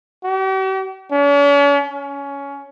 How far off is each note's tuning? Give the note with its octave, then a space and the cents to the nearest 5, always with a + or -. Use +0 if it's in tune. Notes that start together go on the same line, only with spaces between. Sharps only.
G4 -45
C#4 +45
C#4 +20